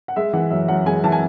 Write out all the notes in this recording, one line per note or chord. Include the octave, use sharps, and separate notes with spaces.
F#5
G#3 E5
E3 F#5
F#2 E5
F#2 F#5
G#3 G#5
E3 A5
G#5